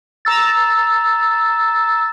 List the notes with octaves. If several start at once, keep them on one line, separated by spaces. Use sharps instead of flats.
A#5 E6 A6